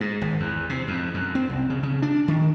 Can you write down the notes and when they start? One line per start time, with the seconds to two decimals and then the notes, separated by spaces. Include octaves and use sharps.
0.01 G#2
0.21 G#1
0.40 E2
0.69 C3
0.88 F2
1.14 F#2
1.35 C4
1.49 C2
1.70 C#3
1.83 C#3
2.02 D4
2.28 D#3